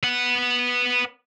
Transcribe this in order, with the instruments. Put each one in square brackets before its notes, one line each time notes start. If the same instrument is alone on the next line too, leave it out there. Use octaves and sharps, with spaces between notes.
[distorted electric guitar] B4 F#5